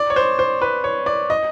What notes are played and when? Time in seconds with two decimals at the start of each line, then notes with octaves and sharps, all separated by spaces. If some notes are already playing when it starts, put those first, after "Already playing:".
Already playing: D5
0.10 C#5
0.16 C5
0.39 C5
0.62 B4
0.84 C#5
1.06 D5
1.30 D#5